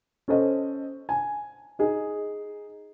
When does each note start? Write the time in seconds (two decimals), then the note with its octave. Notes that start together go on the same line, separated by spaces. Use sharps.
0.28 C#4 A4 C5 D#5
1.09 G#5
1.79 D#4 G#4